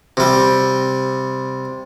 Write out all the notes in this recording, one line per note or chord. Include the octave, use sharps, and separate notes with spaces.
C3 G3